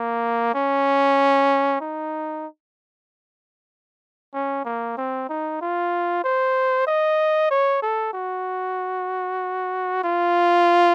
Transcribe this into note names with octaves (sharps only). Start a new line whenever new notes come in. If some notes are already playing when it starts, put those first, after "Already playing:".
Already playing: A#3
C#4
D#4
C#4
A#3
C4
D#4
F4
C5
D#5
C#5
A4
F#4
F4